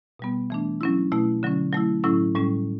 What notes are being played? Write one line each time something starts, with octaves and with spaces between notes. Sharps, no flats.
B2 G3 B3
E3 A3 D4
F#3 C#4 E4
B2 A3 E4
D3 F#3 C#4
F#3 A3 E4
A2 F#3 C#4 E4
A2 G3 C#4